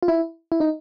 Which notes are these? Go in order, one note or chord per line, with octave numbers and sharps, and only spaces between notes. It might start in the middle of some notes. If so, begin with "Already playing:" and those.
F4
E4
E4
D#4